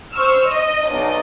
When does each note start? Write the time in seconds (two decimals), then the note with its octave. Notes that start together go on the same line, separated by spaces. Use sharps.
0.13 C5 C#6 E6 F6
0.47 D#5
0.90 B1 D5 D#5